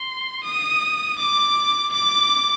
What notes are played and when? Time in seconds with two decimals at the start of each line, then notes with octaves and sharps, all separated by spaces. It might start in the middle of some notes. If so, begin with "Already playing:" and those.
Already playing: C6
0.43 D#6
1.18 D6
1.92 D6